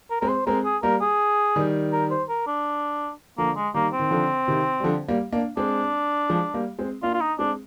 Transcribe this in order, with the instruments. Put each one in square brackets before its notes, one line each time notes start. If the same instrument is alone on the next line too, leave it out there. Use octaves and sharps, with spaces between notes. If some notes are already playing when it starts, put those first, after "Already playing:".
[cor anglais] A#4
[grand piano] G#3 C4 [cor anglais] A#4
[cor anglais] C5
[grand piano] G#3 C4 [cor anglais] A#4
[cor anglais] G#4
[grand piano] G3 A#3 [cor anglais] A#4
[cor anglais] G#4
[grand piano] D#3 G3
[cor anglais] A#4
C5
A#4
D4
[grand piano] D3 F3 [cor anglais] A#3
[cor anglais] G#3
[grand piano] D#3 G3 [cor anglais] A#3
[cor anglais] C4
[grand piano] D#3
D3 F3
C3 D#3
G3
D3 F3
G3 A#3
A#3 D4
[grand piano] G#3 C4 [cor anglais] D4
[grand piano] F3 G#3
G3 A#3
G#3 C4
[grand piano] A#3 D4 [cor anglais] F4
[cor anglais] F4
D#4
[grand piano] G#3 C4 [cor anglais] D4